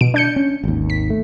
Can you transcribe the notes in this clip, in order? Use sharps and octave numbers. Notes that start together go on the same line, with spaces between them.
B2 D7
D4 G6 C#7
C#4
G#1 D#2
B6
A3